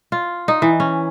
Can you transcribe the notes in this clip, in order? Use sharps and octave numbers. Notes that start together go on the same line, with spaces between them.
F4
D#4
E3
C#4